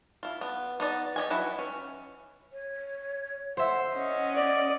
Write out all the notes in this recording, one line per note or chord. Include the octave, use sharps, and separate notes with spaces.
E4 F4
B3
B3 D#4 D5
G4 D#5 G#5
F#3 E4 B4
C#4
C#5
C5 E5 F#5
C#4 D#5 F#5
D5